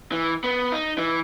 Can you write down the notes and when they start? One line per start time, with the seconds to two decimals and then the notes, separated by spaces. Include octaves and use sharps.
0.12 E3
0.44 B3
0.72 D#4
0.98 E3